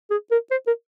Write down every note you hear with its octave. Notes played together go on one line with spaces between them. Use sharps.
G#4
A#4
C5
A#4